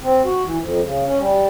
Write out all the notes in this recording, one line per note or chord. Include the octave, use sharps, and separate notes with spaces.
C4
F#4
E3
F2
C#3
C#4
G3